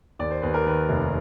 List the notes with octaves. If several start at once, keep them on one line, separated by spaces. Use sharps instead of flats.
D#2 D5
C5
D#2 B4
A#4
D#3 B4
F1